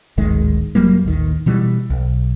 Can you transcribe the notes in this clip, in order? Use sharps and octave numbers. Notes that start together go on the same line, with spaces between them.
D1 G#1 D#3 G#3
F1 F#3 G3 A#3
A1 D#2 D#3
B2 E3 G3
B1